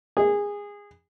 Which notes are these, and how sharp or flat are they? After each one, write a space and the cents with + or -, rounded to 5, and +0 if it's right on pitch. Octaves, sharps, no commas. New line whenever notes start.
G#4 -20